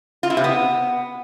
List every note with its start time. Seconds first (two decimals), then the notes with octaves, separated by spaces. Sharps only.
0.23 F4
0.30 E4
0.37 C3
0.44 B3